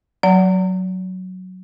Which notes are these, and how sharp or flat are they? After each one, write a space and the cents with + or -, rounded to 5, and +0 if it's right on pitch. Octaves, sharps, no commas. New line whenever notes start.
F#3 +0 D5 -40 A#5 -30